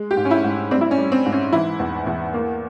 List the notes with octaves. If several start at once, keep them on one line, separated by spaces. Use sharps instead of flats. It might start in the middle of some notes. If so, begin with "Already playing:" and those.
Already playing: G#3
G4
G#2
C#4
E4
G#2
G3 C4
E4
C#4
G3
C4
G#2
C#4
E3 E4
E2
E2
A#3